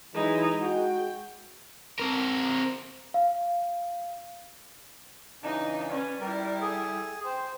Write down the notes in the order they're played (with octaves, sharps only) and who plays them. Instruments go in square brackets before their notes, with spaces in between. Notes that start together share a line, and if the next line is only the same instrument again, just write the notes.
[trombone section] E3 F#3 G#3 [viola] D#4 E4
[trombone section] G#3 F#4 [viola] G5
[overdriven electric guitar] C4 A#4
[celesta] F5
[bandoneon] C#3 E3 D4 [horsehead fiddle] D#4
[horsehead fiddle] C#4 B4 [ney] D5
[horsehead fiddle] G3 E4 [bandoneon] A#4
[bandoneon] G#4 [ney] A4
[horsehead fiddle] C5 [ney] G5